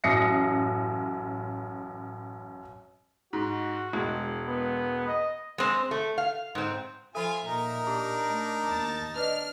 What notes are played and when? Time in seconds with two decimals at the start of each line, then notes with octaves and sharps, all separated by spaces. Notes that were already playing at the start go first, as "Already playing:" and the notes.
0.04 A1 F#2 D#6 A#6 C7 C#7
3.33 G#2 F#4
3.93 E1 G#3
4.47 B3
5.08 D#5
5.58 G#3 C4
5.91 A3
6.18 F5
6.55 G#2 C4
7.15 F3 F4 A4 E5 G#5
7.44 A#2 D#4 A#4
7.87 D4 G4
8.30 A3
8.66 D#2 A5 A6
9.15 D4 B4 D5 D#5 F6